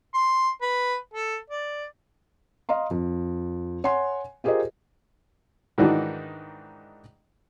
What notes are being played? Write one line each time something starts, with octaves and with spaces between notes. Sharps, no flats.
C6
B4
A4
D5
D#5 F5 A#5 C6
F2
C#5 F#5 G#5 C6
F4 G4 G#4 A#4 C5 D#5
G#2 D#3 E3 D4 D#4 F#4